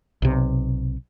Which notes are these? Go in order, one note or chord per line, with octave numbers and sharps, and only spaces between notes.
B1 C3